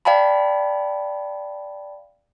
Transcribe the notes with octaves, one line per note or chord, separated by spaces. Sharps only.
D5 F5 G5 A5 B5